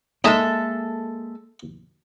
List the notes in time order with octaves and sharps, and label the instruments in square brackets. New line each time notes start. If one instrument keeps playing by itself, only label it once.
[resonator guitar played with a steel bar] G#3 A4 E5 [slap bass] A#3 [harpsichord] D#4 D#5 G#5